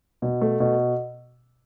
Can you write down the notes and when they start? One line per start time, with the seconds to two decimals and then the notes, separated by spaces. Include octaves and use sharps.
0.22 B2
0.41 A3
0.60 B2